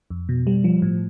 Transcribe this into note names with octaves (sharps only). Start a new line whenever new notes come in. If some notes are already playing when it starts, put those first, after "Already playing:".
F2
B2
G3
F3
A2